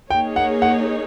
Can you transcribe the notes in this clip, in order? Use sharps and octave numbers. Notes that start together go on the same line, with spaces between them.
A#3 D#4 G#4 C#5 G5
F#5
F#5